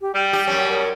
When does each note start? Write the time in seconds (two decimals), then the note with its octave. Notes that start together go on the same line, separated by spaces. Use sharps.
0.01 G4
0.15 G3 G5
0.33 G4
0.47 F#2 C#4
0.68 A#4